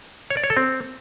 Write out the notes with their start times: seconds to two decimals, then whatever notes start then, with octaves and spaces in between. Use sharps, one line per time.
0.30 C#5
0.37 D5
0.44 C#5
0.50 A4
0.57 C4